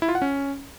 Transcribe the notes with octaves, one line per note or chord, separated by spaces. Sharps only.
E4
F4
F#5
C#4